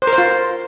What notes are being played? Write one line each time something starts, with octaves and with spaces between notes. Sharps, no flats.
C5
A#4
C5
F4